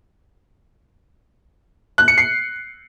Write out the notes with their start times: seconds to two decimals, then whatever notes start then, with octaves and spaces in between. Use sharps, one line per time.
1.98 F#6
2.08 C#7
2.18 C7